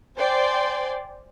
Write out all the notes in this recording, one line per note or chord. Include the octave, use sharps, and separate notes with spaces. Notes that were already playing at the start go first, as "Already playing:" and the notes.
C5 D5 G5 G#5 C6